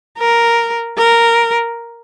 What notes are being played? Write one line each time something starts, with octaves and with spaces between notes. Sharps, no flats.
A#4
A#4